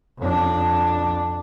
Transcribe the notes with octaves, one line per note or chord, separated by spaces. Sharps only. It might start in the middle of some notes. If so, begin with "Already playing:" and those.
F2 D4